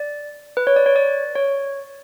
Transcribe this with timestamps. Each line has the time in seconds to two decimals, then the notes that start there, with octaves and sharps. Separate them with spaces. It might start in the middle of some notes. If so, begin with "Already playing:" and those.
Already playing: D5
0.57 B4
0.67 C#5
0.76 D5
0.86 C#5
0.96 D5
1.35 C#5